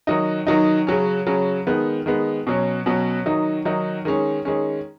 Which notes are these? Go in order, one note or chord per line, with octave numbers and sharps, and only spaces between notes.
D#3 F#3 D#4
D#3 F#3 D#4
C#3 F#3 C#4
C#3 F#3 C#4
D#3 G#3 B3
D#3 G#3 B3
B2 F#3 C#4
B2 F#3 C#4
D#3 F#3 D#4
D#3 F#3 D#4
D#3 G#3 C#4
D#3 G#3 C#4